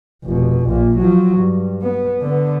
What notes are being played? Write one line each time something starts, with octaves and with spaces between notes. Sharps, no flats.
F1 B2
A#1 A#2
F3 F#3
G2
B3
D3 B3